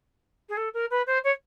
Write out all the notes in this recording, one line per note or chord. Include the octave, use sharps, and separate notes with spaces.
G#4
A4
A#4
B4
C5
C#5